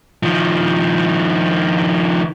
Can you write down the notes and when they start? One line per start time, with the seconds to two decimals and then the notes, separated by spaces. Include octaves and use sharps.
0.23 D#3 F3